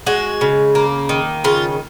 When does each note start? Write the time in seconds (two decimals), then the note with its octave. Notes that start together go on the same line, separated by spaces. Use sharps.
0.07 G#3 F#4
0.41 C#3
0.75 A#3
1.09 D#3
1.44 C#3 F4